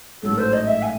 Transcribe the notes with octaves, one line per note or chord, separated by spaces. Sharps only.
A1 G#2 F#3 A3 A4
C5
D#5
E5
G#5